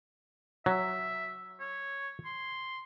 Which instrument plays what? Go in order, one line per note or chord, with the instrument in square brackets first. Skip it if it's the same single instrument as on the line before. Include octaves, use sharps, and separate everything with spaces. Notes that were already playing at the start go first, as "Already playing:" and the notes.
[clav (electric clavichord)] F#3 [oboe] E5
[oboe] C#5
C6